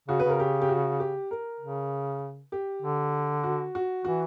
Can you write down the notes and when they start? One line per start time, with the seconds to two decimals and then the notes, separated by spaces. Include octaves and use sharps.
0.08 C#3 F#4
0.20 C#3 B4
0.29 A#4
0.40 G4
0.61 G4
0.69 F#4
1.00 G4
1.31 A#4
1.60 C#3
2.52 G4
2.82 D3
3.44 F#4
3.75 F#4
4.05 E3 F#4